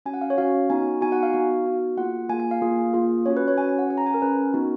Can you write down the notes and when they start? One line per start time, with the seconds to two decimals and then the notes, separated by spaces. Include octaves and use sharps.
0.06 C#4 F#4 G#5
0.14 F#5
0.21 F5
0.30 C#5
0.38 C#4 F#4 F5
0.70 B3 D#4 F#4 G#5
1.01 B3 D#4 F#4 G#5
1.12 F#5
1.23 F5
1.33 B3 D#4 F#4
1.65 B3 D#4 F#4
1.97 A#3 F4 G#4 F#5
2.29 A#3 F4 G#4 G#5
2.40 G#5
2.51 F5
2.61 A#3 F4 G#4
2.94 A#3 F4 G#4
3.26 C#4 F#4 C#5
3.37 B4
3.48 C#5
3.58 C#4 F#4 G#5
3.69 G#5
3.79 F#5
3.90 C#4 G#4 G#5
3.98 A#5
4.06 G#5
4.14 A#4
4.22 C#4 G#4 B4
4.54 B3 D#4 F#4